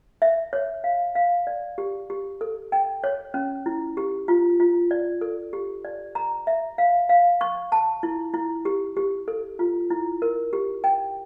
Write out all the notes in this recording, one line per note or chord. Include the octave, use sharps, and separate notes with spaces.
E5
C#5
F5
F5
D5
G4
G4
A4
G5
C#5
C#4
E4
G4
F4
F4
D5
A4
G4
D5
A#5
E5
F5
F5
C#6
A5
E4
E4
G4
G4
A4
F4
E4
A#4
G4
G5